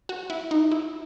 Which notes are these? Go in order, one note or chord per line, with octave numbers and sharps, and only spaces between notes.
F#4
E4
D#4
E4